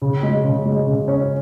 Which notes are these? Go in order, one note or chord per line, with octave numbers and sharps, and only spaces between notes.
C#3
G#3
C#3
G#3
C#3
C#4